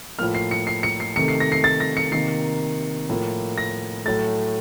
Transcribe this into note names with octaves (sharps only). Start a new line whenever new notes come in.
A2 F3 A#3 F6
C7
C#7
C7
C#7
C7
C3 D#3 A3 C#7
C7
A#6
C7
A6
A#6
C#7
C3 D#3 A#3 C7
A2 F3 A#3
A#6
A2 F#3 A3 A6